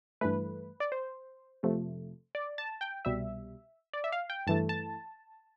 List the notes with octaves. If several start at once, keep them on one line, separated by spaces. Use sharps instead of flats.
G2 E3 A3 B4
D5
C5
F2 C3 F3 A3
D5
A5
G5
C2 B2 G3 E5
D5
E5
F5
G5
G2 E3 A3 A5
A5